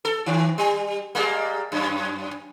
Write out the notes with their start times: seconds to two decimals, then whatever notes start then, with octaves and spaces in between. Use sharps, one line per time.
0.05 A4
0.26 D#3
0.58 G3
1.15 G3 G#3 A#3
1.72 F#2